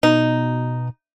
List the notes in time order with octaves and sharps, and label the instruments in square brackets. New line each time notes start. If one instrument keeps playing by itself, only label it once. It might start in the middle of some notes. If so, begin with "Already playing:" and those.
[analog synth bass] B2 [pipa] D#4